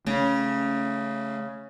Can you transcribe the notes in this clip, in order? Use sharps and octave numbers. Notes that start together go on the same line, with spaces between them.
C#3 A3 C4 C#4